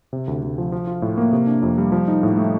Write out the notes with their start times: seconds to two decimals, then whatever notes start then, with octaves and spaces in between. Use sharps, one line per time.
0.13 C3
0.28 D2
0.43 D2
0.58 F3
0.72 F3
0.87 F4
1.02 A2
1.17 A#3
1.32 C3
1.47 D4
1.63 F2
1.78 G3
1.92 F3
2.08 D#4
2.23 A2
2.37 A3